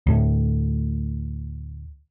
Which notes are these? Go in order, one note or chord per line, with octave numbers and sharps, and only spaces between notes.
D2 A2